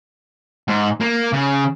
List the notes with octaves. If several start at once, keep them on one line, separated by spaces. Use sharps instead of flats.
G#2
A#3
C#3